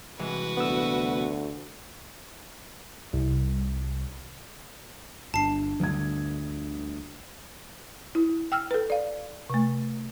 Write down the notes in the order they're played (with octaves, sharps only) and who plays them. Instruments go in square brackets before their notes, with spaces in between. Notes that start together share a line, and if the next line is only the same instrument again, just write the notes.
[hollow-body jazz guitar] C2 E3 G#3 [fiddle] F#4 B4
[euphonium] D2 [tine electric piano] B3 E6
[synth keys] C2
[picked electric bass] G1 [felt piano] D4 [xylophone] A5 C7
[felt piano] G1 G#6 [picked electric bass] D2
[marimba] E4
G5 E6 F6
A4 B4
D5 F5
C3 A3